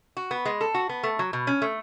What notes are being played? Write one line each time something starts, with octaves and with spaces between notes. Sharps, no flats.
F#4
B3
G#3
A4
F#4
B3
A3
F#3
B2
C#4
A3